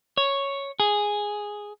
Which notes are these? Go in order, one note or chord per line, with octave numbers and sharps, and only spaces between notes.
C#5
G#4